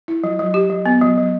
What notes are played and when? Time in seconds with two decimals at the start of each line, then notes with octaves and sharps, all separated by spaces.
0.08 E4
0.24 F#3
0.39 F#3
0.54 G4
0.70 F#3
0.86 B3
1.01 F#3
1.18 F#3